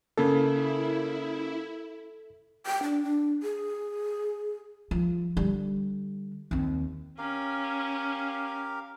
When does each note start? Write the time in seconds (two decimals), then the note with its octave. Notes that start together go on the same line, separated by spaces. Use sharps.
0.18 C#3 A#3 E4 A4
2.67 G5
2.83 D4
3.03 D4
3.43 G#4
4.91 F3
5.37 D3 G3
6.51 D#2 C4
7.18 C#4 G4 A#4 F5